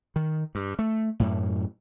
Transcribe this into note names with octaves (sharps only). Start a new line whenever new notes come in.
D#3
G2
A3
F#2 A2